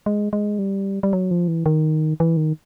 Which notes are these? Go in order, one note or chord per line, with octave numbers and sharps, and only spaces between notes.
G#3
G#3
G3
G3
F#3
F3
E3
D#3
E3
D#3